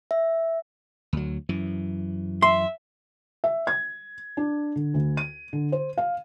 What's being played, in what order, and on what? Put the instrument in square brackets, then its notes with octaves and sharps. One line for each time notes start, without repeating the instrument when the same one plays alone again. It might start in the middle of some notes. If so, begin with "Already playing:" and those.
[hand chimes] E5
[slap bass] D2 F#3
F#2 E3
[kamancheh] E5 [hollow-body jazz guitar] C6
[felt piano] E5
G#6
D4
D3
D2
D#7
D3
C5
F5